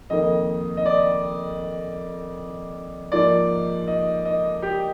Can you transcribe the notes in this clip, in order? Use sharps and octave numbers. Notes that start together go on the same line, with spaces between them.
F2 D#3 A#3 D#5
D#5
D5
G#2 F3 A#3 D5
D#5
D#5
G4